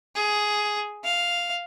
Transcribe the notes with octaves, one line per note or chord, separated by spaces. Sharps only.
G#4
F5